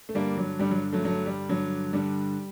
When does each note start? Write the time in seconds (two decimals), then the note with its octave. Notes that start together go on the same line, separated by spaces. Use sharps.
0.09 A3
0.15 G2 D3 G3 A#3
0.37 F#3
0.59 G2 D3 G3
0.71 F#3
0.93 F#3 A3
1.04 G2 D3 F#3 A3
1.26 G3
1.49 G2 D3 F#3
1.93 G2 D3 G3